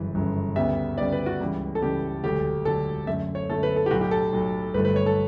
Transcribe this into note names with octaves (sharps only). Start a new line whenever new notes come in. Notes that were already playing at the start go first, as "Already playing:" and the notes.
Already playing: G1 F#2 C#3 E3
G1 F#2 C#3 E3
D2 C#3 G3 B3 E5
D2 C#3 G3 B3 D5
B4
F#4
C#2 C#3 E3 G3
A4
C#2 C#3 E3 G3 G4
E1 D2 D3 F#3 A3 G4
E1 D2 D3 F#3 A3 A4
F#2 D3 A3 E5
C#5
F#2 D3 A3 A4
B4
A4
G4
B1 A2 F#3 F#4
G4
A4
B1 A2 F#3
G1 G2 D3 F#3 A3 B4
B4
C#5
A4